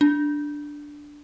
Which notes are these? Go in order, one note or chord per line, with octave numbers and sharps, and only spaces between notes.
D4